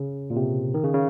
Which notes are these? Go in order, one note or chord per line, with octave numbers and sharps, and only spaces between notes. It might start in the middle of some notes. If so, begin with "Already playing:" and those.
Already playing: C#3
A#2
C3
D#3
C#3
C#3